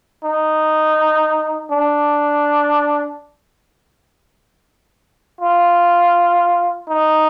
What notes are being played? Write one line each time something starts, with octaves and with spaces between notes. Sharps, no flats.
D#4
D4
F4
D#4